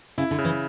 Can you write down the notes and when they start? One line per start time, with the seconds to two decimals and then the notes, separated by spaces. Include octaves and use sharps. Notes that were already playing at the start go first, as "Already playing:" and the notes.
0.18 C#3 E4
0.31 D3
0.38 C#3
0.45 E3